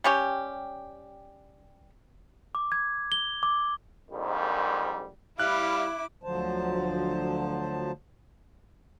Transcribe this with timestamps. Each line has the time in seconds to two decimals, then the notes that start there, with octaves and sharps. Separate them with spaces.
0.04 G3 C#4 G4
2.55 D6
2.72 G#6
3.12 G7
3.43 D6
4.11 A#1 F2 G#2 D#3 G3
5.39 G3 E4 F5 D6 F#6
6.23 D2 D3 F3 F#3 C5 A5